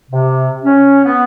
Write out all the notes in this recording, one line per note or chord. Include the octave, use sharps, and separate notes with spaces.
C3
C#4
B3